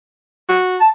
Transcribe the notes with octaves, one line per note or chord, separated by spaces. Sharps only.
F#4
A5